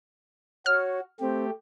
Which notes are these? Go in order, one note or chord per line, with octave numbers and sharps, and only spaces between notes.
F#4 C#5 F6
A3 C4 G4